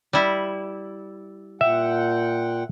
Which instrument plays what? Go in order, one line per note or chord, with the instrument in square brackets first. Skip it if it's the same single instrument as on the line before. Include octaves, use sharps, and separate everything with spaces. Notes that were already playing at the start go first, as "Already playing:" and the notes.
[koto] G3 E4
[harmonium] A#2 F#5 G5 [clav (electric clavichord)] E5